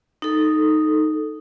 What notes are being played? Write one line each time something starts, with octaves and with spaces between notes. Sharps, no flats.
D#4 A4